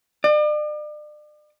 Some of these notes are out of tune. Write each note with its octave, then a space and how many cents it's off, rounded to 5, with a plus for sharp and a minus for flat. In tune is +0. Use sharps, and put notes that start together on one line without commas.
D5 +40